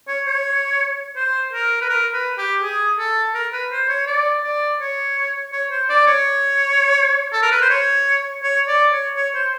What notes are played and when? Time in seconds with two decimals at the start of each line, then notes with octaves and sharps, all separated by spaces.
0.08 C#5
0.27 C#5
1.16 C5
1.53 A#4
1.81 B4
1.90 A#4
2.13 B4
2.38 G4
2.63 G#4
2.99 A4
3.34 A#4
3.53 B4
3.72 C5
3.89 C#5
4.07 D5
4.44 D5
4.81 C#5
5.53 C#5
5.71 C5
5.90 D5
6.07 C#5
7.33 A4
7.42 A#4
7.51 B4
7.62 C5
7.70 C#5
8.43 C#5
8.68 D5
8.92 C#5
9.16 C#5
9.35 C5